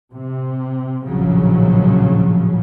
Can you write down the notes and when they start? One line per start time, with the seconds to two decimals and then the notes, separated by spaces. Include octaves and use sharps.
0.12 C3
1.06 A#1 D#2 A2 C#3 F3 F#3